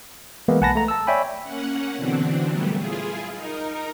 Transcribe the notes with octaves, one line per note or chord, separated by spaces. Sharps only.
E3 G#3 A#3 B3 E4
B1 F#5 G#5 A5 B5 A#6
A3 A#5
A5 E6
C#5 D5 E5 G5 G#5 B5
A#3 C#4 F#5
B2 D3 E3 C4 D4
A#2 F#3 G3 A3 B3
E4 F4 G#4
D#4 A#4